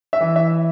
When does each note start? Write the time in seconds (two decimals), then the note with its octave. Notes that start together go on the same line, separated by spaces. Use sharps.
0.13 E5
0.20 E3
0.36 E5